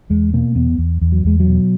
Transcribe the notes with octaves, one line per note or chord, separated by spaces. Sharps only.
E2 G#3
B2 A#3
E2 B3
E2
E2
F#3
E2 G#3
F#3
B2